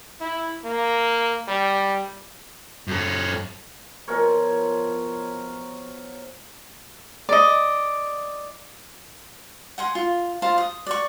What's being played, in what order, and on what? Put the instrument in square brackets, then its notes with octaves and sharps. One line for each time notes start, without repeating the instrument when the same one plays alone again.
[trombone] E4
A#3
G3
[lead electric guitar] F#2 A4
[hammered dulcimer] B2 F3 A#4 C#5
[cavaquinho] D5 D#5
F#5 G#5 C6
F4
F4 C5 F5 A5
D#6
D5 C#6